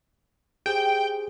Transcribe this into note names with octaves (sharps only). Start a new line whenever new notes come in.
G4 G#4 C5 G5